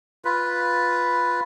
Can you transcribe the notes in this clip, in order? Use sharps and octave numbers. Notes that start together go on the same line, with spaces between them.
F4 B4